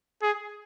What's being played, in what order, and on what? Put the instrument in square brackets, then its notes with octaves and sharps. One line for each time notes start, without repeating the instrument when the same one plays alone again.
[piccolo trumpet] G#4